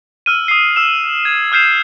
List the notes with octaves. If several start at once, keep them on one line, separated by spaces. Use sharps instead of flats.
E6 F6 D#7
D#6 C7
E6 E7
G#6
D#6 F6 G6 C7 E7